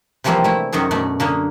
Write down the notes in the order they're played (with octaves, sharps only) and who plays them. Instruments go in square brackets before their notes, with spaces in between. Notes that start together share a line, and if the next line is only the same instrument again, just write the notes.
[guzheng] C3 E3 F3 G3 A#3 C4
A3 E4
F#2 D#3 F#3 G#4
F#2 B2 A3 D5
D3 A#3 C#4 G#4